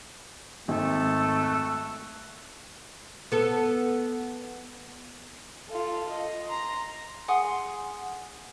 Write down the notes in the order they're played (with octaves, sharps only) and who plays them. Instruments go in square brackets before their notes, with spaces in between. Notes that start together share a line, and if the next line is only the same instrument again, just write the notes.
[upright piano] G#1 [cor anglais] A3
[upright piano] F#6
[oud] B3 A4
[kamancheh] F4 A4
D#5
A#5 C6
[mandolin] G#4 F#5 C6 D#6